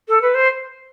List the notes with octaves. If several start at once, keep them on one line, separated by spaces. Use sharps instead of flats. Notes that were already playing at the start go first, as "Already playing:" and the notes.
A4
B4
C5